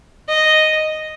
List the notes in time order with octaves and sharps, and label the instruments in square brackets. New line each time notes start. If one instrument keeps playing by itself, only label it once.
[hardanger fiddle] D#5